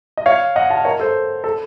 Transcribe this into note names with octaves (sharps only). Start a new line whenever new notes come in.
D#5
C#5 F5
D#5 F#5
F5 A5
A#4 C#5
A4 C5
A4